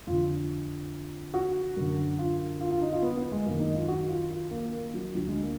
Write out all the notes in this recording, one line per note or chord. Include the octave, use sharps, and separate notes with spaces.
F2 D3 F4
F#4
F#2 D3
F4
F4
F4
D#4
F4
B3
B3
G#3
F#2 D#3 A#3
D#4
F4
F#4
F4
F4
A#3
A#3
F#3
D2 D3 F#3
G#3
A#3